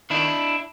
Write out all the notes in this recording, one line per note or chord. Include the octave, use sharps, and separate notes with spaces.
D#3 D4 E4